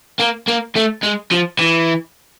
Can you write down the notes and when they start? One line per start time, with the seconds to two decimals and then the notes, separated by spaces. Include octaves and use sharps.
0.20 A#3
0.48 A#3
0.76 A3
1.03 G#3
1.32 F3
1.59 E3